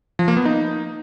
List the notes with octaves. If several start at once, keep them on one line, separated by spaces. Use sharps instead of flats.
F3
A#3
B3
D#4